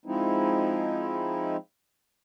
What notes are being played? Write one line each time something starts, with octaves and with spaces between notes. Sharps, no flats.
F3 G#3 C4 D#4 E4